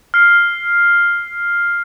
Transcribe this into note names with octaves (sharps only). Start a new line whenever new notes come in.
F6 C7